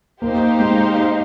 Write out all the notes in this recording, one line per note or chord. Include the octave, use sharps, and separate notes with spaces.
A#3 D#4 G4 C5 F5
G#3